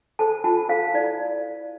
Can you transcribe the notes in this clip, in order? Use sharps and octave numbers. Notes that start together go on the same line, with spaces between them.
A4 C5 A5
F4 A5
A4 C5 F5
E4 D5